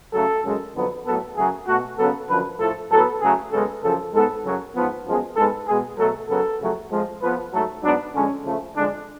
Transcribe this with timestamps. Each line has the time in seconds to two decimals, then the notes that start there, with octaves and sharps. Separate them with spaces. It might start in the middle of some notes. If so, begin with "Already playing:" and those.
0.13 C#3 F#3 A3 A4
0.44 F#2 C#3 G#3
0.75 F2 D3 F#3 B3
1.06 A2 F#3 B3 A4
1.37 F#2 C#3 F#3 A3 G#4
1.67 B2 A3 F#4
1.98 C#3 F#3 B3 A4
2.29 F#2 D3 F3 B4
2.60 A2 F3 A3 A4
2.91 A2 F#3 B3 A4
3.21 C#3 F#3 A3 G#4
3.52 F#2 C#3 G#3 B3 A4
3.83 F#2 C#3 F3 A4
4.13 G#2 G#3 B3 A4
4.44 F#2 C#3 F#3
4.75 G#2 F3 B3
5.06 F#2 F3 G#3 B3
5.36 G#2 G#3 B3 A4
5.67 B2 G#3 B3 G#4
5.98 B2 F#3 A3 A4
6.29 F#2 C#3 F#3 B3 A4
6.60 F2 C#3 F#3 A3
6.91 F2 F3 G#3
7.22 F2 F3 B3 B4
7.52 G#2 F#3 A3 A4
7.83 G#2 F#3 B3 D4
8.14 F2 D3 G#3 C#4
8.44 C#3 F3 A3
8.75 F2 D3 G#3 D4